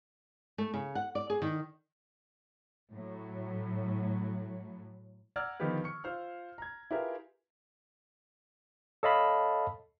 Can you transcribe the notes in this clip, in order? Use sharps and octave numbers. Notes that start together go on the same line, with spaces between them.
A3
C#3
F#5
D5
G#4
D#3
A2 F#3
D5 F#5 A#5 E6 F6 G#6
D3 D#3 F3 B3 G4 B4
C#6 C#7
F4 C5 F6
A#5 G#6
E4 F4 G4 G#4 A#4 B4
A4 C#5 D#5 F5 A5 B5